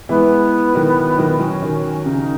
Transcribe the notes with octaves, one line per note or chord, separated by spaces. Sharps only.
E3 G#3 B3
D#3 F#3
D#3 F#3
D#3 F#3 C#4
D#3
C#3 D#4